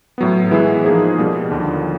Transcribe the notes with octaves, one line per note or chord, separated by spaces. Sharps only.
A2 F#3 B3
E3 G#3 B3 E4
F3 A#3 D#4 G#4 C5
B2 G3 A#3
D#2 D3 F3